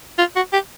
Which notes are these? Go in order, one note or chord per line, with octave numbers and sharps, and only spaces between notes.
F4
F#4
G4